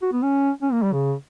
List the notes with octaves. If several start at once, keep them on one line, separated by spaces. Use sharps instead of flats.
F#4
B3
C#4
C#4
A#3
G3
C#3